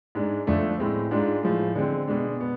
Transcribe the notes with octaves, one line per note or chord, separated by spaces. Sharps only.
G#2 G#3 D4
D2 D3 F3 A3 D4
A2 G#3 C4
G#2 G#3 D4 F4
A2 F3 G#3
D3 G#3 C4
B2 G#3 D4
B2 B3